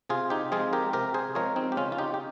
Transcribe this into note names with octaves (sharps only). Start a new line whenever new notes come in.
C3 F4 G#4
D#4 G4
F3 G#3 C4 F4 G#4
G4 A#4
C3 G4 A#4
G#4 C5
F3 G#3 C4 A#4 C#5
C4 D#4
G4
C#3 C#4 F4
F4
D#4 G4
G4